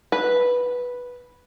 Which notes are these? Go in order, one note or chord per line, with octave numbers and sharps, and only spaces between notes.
B4